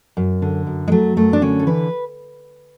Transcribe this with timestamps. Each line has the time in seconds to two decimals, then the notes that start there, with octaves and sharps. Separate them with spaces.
0.17 F#2
0.42 D3
0.67 F#2
0.88 G#3
0.92 F#3 A3
1.17 F#2 A3
1.33 D4
1.41 D3 C#4
1.59 A4
1.67 E3 B4